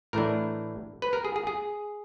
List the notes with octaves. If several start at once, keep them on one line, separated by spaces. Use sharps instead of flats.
A2 E3 A3 D4 A#4
B4
A#4
G#4
G#4
G#4